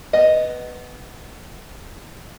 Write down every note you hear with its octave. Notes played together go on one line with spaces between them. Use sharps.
B3 D#5